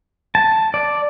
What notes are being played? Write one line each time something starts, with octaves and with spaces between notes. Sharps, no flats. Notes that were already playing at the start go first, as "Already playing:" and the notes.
A5
D5